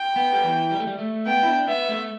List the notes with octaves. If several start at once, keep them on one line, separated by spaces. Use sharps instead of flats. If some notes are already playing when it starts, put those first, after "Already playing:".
Already playing: G5
B3
G3
E3
G3
A3
G3
A3
B3 G5
E4
D4
B3 E5
A3